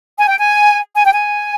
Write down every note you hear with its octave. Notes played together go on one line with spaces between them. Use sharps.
G#5
G5
G#5
G#5
G5
G#5